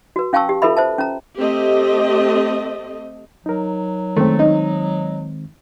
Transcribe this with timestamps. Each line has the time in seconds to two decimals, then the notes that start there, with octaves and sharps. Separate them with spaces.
0.16 F#4 B4
0.33 C#4 F5 G5 A5 C#6 E6
0.49 G4
0.62 F4 A4 B4 E5 B5
0.77 C5 E5 A5
0.98 C#4 A#5
1.38 A3 C4 G4 D#5
3.46 F#3 D#4 A#4
4.17 D#3 G#3 A3 C4
4.39 D#4